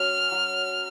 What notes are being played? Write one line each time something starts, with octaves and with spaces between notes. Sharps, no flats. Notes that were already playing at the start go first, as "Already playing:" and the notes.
Already playing: F#3 C#4 F#4 F6
F#3 C#4 F#4